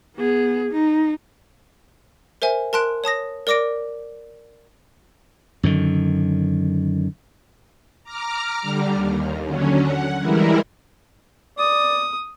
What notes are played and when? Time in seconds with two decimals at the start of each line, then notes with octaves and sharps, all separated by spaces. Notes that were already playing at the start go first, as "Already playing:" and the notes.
0.17 B3 G#4
0.72 D#4
2.42 A#4 C5 E5 G#5
2.73 A#4 A5 C6 F#6 D7
3.04 C#5 A5 D#6 A#6
3.47 A#4 D5 D6 A#6 D7
5.63 F#2 D3 D#3
8.04 A#5 D6 F6
8.62 D3 G3
8.93 D#2
9.46 D3 F#3 C#4
9.80 F#5
10.20 E3 G3 G#3 E4 A#4
11.58 D5 D#6